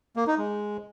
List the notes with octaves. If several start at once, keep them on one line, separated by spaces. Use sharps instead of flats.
A#3
D#4
G#3